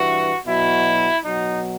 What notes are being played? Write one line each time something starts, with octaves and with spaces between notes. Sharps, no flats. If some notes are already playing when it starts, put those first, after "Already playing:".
Already playing: G2 E3 F#4
B2 F#3 E4
B2 F#3 D#4